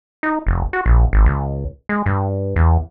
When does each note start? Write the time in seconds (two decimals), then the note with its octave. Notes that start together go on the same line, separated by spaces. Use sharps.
0.23 D#4
0.47 F1
0.73 F#4
0.86 A#1
1.13 G#1
1.26 C#2
1.89 G#3
2.06 G2
2.56 E2